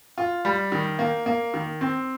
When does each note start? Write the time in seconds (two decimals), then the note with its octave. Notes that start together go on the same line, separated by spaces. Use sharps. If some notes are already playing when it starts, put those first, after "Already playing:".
0.18 F4
0.45 G3
0.72 D#3
0.99 A#3
1.26 A#3
1.54 D#3
1.81 C4